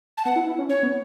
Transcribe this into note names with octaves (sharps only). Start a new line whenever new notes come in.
A5
B3 F#5
E4
E4
C#4
C#4 C#5
B3